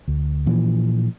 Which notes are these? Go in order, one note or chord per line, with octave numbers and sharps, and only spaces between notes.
D2
A#2 E3 F3